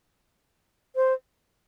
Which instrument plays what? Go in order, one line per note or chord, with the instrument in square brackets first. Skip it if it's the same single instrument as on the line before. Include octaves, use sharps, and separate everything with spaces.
[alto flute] C5